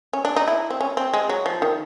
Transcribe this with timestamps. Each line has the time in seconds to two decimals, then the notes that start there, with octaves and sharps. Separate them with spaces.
0.13 C#4
0.25 D4
0.36 D#4
0.48 E4
0.70 C4
0.81 C#4
0.97 C4
1.14 G#3
1.29 F#3
1.46 F3
1.62 D#3